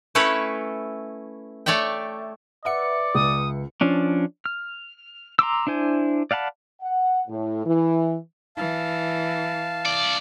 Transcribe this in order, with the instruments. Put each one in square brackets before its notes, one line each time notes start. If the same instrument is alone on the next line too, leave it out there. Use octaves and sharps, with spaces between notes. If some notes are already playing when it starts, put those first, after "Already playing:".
[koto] A3 C#4 E4 A4 B4 C#5
A3 C#5 D5 E5 G5
[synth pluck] B4 E5 C#7 [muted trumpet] D5 [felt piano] F#5
[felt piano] C#2 [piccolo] D#6
[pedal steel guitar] F3 C#4 D4
F6
A#5 C6 D6 E6
D4 E4 C5 G#5
D5 F5 F#5 A5 B5
[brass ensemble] F#5
A2
E3
[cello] E3 [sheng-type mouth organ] F5 A5
[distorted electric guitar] C2 D5